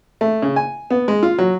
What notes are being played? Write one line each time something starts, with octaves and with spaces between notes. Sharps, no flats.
A3
C#3
G#5
B3
G#3
F4
F#3